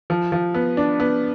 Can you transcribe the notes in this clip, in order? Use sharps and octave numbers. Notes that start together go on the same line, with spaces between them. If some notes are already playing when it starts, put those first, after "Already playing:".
F3
F3
B3
D4
B3